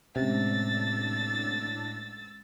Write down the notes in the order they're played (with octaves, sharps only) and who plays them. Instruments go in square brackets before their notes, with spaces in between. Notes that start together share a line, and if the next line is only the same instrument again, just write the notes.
[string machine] A2 D4 A#6 [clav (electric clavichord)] C3 [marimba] G#3 C#4 [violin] E6 A6